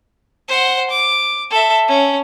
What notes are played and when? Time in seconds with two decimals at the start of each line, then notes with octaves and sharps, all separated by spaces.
0.48 C5 F#5
0.90 D6
1.51 A4 E5
1.88 C#4